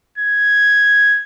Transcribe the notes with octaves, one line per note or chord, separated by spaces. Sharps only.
G#6